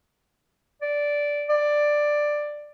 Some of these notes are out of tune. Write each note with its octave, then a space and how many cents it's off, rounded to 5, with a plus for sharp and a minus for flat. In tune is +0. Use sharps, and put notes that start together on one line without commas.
D5 -10
D5 +10